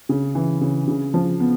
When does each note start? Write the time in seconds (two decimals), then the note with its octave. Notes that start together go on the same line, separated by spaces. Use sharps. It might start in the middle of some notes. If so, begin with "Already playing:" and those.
0.09 C#3
0.35 E3
0.61 C#3
0.88 C#3
1.14 F3
1.40 B3